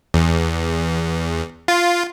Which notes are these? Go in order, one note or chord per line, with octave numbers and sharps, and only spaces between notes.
E2
F4